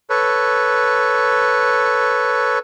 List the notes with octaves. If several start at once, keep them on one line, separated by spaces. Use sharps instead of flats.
A4 B4 C#5